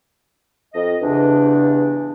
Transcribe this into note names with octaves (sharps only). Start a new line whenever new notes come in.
F2 D#5
E2 G2 C#3 D4